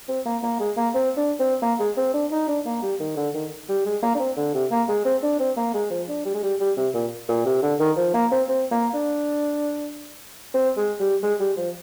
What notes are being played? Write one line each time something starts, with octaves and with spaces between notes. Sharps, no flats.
C4
A#3
A#3
G#3
A#3
C4
D4
C4
A#3
G#3
C4
D4
D#4
D4
A#3
G3
D#3
D3
D#3
G3
G#3
A#3
D4
C4
D3
C3
A#3
G#3
C4
D4
C4
A#3
G#3
F3
D4
G3
G#3
G3
G3
C3
A#2
A#2
C3
D3
D#3
F3
A#3
C4
C4
A#3
D4
C4
G#3
G3
G#3
G3
F3